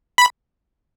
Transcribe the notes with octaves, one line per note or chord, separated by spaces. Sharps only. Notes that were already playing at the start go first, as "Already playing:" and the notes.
B5